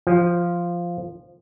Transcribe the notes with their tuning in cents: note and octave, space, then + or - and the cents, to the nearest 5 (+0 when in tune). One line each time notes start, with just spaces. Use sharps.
F3 -5